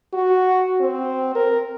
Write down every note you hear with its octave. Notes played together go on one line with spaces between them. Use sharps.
F#4
C4
A#4